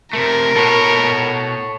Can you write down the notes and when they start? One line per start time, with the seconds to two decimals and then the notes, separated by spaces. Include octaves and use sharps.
0.13 C3 A3 A#4
0.56 B2 A4 C#5